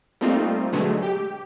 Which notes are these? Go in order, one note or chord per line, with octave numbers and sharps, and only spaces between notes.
G3 A3 A#3 C4 D#4 F4
B2 D3 F#3 G#3 A3
G4